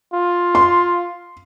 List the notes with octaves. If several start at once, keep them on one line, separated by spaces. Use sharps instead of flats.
F4
C6